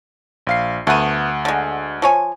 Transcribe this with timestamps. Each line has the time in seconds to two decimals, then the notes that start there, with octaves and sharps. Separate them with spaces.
0.47 A#1 F5 C7
0.87 D2 A3 B3 F#5 D#7
1.45 D3 G#3
2.02 F3 C#5 G#5